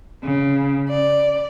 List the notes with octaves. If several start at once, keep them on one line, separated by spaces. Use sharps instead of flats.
C#3
D5